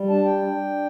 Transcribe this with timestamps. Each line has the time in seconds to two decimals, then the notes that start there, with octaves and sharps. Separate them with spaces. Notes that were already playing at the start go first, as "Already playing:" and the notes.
Already playing: G3
0.10 D4 A5
0.25 G5
0.42 D4